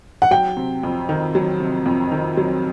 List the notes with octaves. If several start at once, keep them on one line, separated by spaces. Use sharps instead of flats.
F#5
F#3 G5
C3
F2
D#3
F#3
C3
F2
D#3
F#3